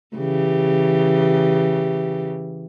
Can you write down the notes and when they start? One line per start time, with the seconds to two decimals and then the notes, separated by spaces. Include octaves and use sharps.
0.16 C#3 E3 G4